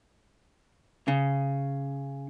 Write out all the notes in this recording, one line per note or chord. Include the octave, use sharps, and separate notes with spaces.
C#3